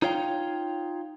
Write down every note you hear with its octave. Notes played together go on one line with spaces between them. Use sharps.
D#4 F4 C#5 F5 G5